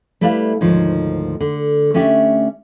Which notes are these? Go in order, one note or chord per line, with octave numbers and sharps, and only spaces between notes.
G3 A3 E4 B4 D5 F5
D2 G#2 D#3 F3 D#4 C#5
D3
A3 C#4 D4 G4 D5 E5